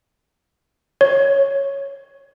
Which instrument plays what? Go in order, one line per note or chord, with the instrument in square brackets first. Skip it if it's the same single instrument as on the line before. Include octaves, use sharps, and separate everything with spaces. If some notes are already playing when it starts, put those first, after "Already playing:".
[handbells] C#5